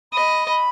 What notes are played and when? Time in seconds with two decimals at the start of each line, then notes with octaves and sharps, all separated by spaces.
0.13 D#5 B5
0.48 B5